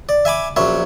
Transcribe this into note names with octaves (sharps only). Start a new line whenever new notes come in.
D5
E5 G#5 B5 D6
A#1 F#3 C#4 E5